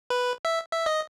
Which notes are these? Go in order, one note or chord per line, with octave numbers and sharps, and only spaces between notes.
B4
E5
E5
D#5